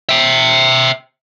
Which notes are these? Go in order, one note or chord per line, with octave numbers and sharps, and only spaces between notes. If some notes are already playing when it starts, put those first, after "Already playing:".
E5 G5